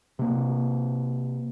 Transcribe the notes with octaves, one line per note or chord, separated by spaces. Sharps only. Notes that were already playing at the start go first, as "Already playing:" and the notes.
C3 A#3